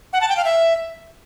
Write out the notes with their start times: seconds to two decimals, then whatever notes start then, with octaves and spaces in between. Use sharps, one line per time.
0.13 F#5
0.21 A5
0.29 G5
0.37 F5
0.45 E5